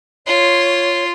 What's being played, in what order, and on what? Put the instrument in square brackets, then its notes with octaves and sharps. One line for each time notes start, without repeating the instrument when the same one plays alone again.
[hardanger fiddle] F4 C6 [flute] C#5